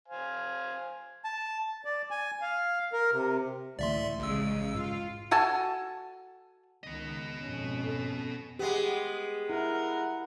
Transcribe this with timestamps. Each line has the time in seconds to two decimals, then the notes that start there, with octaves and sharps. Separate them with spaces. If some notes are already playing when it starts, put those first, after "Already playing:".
0.08 C5 F5 G#5
1.24 A5
1.85 D5
2.11 G#5
2.42 F5
2.93 A#4
3.12 C3
3.79 C#2 A2 D3 E3 D5 E5 C6
4.19 A1 C#3 G#3 E6
4.75 G#2 F4
5.31 F#4 A4 G#5 A5
6.84 C#2 D#3 B3 D#5
7.41 G#1 F2 B2 C#4
7.84 A4
8.59 G#3 B3 G4
9.50 E4 A#4 F#5